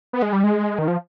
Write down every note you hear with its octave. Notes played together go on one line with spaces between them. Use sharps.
B3
G#3
G3
G#3
D#3
F3